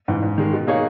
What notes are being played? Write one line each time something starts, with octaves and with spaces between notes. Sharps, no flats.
G#2 E3
G#2
D#3 G#3
B2
A#3 D#4 G#4 C#5